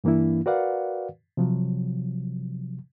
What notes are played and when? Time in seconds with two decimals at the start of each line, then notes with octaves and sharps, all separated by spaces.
0.04 G2 E3 A#3 D4 E4
0.46 F#4 A#4 B4 D5 F5 F#5
1.37 C3 F3 F#3